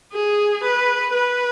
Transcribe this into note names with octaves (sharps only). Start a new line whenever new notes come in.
G#4
B4
B4